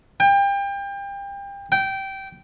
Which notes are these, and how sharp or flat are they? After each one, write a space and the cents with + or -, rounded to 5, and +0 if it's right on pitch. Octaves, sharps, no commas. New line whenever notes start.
G5 +30
G5 -15